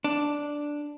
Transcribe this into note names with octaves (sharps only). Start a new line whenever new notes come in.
D4